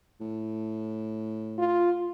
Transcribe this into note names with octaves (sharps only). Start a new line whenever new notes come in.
A2
F4